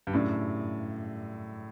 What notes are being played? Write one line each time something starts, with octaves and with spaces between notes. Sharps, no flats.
G2
F#2 A2 C#3 G3 D4